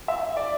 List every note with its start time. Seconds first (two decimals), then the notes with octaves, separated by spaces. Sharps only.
0.08 E5
0.37 D5